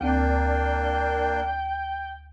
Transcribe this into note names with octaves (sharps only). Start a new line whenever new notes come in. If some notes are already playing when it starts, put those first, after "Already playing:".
D2 A#3 C4 D4 G5